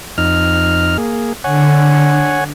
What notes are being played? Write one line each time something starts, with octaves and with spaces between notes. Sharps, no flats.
F2 D#4 F6
A#3 G#4
D3 C#5 F#5 G#5